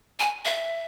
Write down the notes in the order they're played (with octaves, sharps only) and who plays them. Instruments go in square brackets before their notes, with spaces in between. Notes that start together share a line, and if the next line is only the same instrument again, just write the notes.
[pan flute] G#5
E5